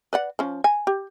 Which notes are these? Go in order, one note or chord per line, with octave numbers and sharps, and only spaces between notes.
B4 D5 F#5
F3 C#4
G#5
G4